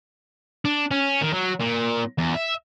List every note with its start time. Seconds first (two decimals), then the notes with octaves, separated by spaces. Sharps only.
0.65 D4
0.91 C#4
1.21 D#3
1.33 F#3
1.60 A#2
2.18 E2
2.35 E5